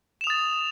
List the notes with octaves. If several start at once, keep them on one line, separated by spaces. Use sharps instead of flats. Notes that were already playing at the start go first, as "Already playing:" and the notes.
D#6 A6 E7 F7